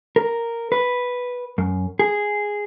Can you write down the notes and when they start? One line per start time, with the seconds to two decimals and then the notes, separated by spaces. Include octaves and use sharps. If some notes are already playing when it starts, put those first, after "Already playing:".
0.16 A#4
0.72 B4
1.58 F#2
1.99 G#4